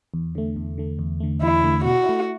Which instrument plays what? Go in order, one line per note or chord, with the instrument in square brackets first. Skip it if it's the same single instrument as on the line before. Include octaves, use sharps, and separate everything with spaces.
[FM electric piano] E2
D3 A3
E2
D3 A3
E2
D3 A3
[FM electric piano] E2 [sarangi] E4
[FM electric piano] D3 A3
[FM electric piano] B2 [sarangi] F#4
[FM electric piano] A3 E4